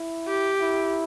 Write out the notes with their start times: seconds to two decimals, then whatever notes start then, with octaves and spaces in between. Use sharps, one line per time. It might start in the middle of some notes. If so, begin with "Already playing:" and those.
Already playing: E4
0.28 G4
0.61 E4